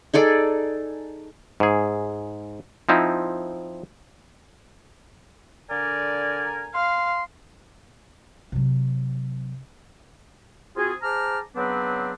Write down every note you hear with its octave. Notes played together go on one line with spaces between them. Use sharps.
D#4 G#4 A4 D5
G#2 G#4
F3 C4 D#4 E4
D3 A#4 D5 G#5
F5 C6
C3 F#3
C4 F4 F#4 G#4
G#4 C5 A5 A#5 D6 F6
C#3 F#3 B3 C4 D4 B4